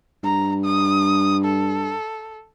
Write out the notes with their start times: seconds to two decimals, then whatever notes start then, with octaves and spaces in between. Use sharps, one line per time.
0.23 G2 A#5
0.65 D#6
1.45 A4